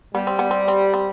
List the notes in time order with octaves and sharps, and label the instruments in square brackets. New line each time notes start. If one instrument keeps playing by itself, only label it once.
[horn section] G3 [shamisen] B3
[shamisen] C4
B3
C4
C4
C4